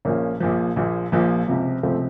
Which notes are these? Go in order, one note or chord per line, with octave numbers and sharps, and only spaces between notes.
A#1 A#2 F3 A#3 C#4
A#1 A#2 F3
A#1 A#2 F3
A#1 A#2 F3
C#2 C3 F3
C#2 C3 F3 A3 C4